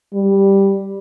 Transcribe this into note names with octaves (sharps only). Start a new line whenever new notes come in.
G3